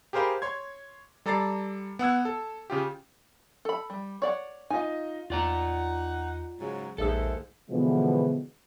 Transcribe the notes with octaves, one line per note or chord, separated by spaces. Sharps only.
G4 G#4 A#4 C5 F5 B5
C#5 C6 G#6
G3 A4 D5 A#5 A6 C7
B3 F#5 E6 G#6
A4
C#3 F4 G4
A4 B5
G3
C#5 D5 F#5
D#4 F4 D#5 G#5
E2 D#4 F4 D5 F#5 A#5
G#2 C#3 F#3
A#1 D#2 G#2 A4 E5 E6
B2 D3 E3 F3 G#3 B3